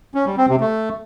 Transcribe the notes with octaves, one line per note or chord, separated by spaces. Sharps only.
C#4
G3
C4
C3
A3